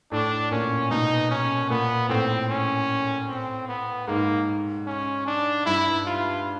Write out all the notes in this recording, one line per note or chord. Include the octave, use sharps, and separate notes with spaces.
A2 D4
A#2 C#4
B2 D#4
C#4
A#2 B3
A2 C4
C#4
C4
B3
G#2 A#3
C#4
D4
G2 E4
F4